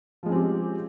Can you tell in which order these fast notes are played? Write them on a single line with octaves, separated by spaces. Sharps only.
F3 G#3 C#4 C4 G4